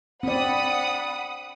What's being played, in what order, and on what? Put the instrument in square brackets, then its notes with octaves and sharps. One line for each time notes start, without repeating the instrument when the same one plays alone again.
[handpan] C4 D5 [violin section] F#5 B5 D#6